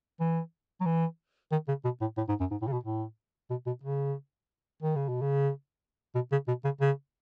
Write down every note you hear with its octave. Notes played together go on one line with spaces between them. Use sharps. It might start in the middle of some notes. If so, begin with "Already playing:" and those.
E3
F#3
E3
D#3
C#3
B2
A2
A2
G#2
F#2
G#2
A2
C#3
B2
A2
B2
B2
C#3
D#3
C#3
B2
C#3
B2
C#3
B2
C#3
C#3